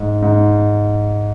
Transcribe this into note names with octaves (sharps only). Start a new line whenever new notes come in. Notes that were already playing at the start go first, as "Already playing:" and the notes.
Already playing: G#2
G#2